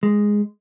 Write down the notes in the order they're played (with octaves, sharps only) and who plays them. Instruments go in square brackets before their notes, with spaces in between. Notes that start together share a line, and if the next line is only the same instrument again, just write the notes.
[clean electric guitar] G#3